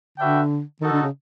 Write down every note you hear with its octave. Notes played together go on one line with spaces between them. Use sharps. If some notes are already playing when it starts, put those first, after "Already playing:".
D3 D4 F#4 B4 E5 G5
D#3 D#4 F#4 A4
D3
C#3